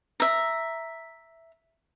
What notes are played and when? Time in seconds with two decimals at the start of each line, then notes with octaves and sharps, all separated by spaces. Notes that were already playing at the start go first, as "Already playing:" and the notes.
0.20 E5 A#5